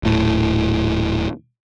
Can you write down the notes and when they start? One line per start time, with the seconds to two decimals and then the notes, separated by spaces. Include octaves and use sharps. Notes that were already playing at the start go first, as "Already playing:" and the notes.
0.03 D#1 A2